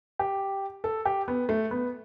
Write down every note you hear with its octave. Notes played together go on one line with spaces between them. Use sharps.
G4
A4
G4
B3
A3
B3